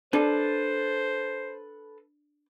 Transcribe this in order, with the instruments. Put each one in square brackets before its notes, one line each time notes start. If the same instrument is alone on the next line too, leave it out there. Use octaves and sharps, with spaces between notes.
[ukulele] D4 [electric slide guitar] A4 B4 [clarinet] C5